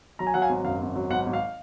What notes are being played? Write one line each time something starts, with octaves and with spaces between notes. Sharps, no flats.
F#3 A#5
G#5
F#3 F#5
F5 G#5
G#1
F#2 F5
G#1
F#3
G#1 F#5
G#1
F5